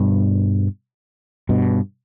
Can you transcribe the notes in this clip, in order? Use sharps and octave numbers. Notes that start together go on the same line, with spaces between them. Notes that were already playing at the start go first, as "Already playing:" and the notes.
Already playing: G2 B2
G2 B2